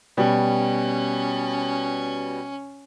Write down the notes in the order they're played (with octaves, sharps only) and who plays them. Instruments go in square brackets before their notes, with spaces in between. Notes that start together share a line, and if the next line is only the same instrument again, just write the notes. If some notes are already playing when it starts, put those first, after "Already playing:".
[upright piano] B2 G3 [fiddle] C#4